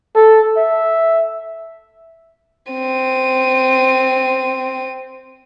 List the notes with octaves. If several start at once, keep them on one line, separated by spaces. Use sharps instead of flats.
A4
E5
C4 D#7